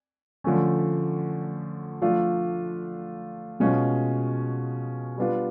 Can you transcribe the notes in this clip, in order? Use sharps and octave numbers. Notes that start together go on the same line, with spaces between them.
D3 F3 A3 C#4
F3 A3 D4 F4
B2 G#3 C#4 F4
G3 B3 D4 F4